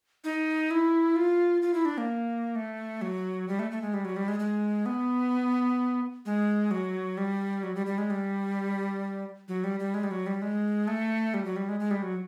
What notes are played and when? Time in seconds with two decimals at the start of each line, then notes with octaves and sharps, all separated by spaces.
0.24 D#4
0.71 E4
1.16 F4
1.62 F4
1.74 E4
1.85 D4
1.98 A#3
2.56 A3
3.02 F#3
3.48 G3
3.59 A3
3.71 A3
3.82 G#3
3.94 G3
4.05 F#3
4.16 G3
4.28 G#3
4.39 G#3
4.86 B3
6.26 G#3
6.71 F#3
7.17 G3
7.63 F#3
7.75 G3
7.86 G3
7.98 G#3
8.10 G3
9.48 F#3
9.64 G3
9.80 G3
9.94 G#3
10.04 G3
10.11 F#3
10.26 G3
10.42 G#3
10.88 A3
11.34 G3
11.45 F#3
11.56 G3
11.69 G#3
11.80 G#3
11.91 G3
12.02 F#3